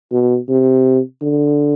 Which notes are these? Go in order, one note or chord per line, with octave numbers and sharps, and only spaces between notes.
B2
C3
D3